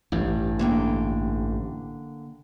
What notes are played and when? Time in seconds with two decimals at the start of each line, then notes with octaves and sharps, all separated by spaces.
0.12 A1 G2
0.59 D3 A#3 G5